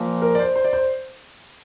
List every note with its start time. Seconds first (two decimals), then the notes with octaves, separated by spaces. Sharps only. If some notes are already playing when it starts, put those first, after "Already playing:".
Already playing: A#2 F3 A#3
0.22 A#4
0.35 D5
0.39 C5
0.56 C5
0.65 D5
0.73 C5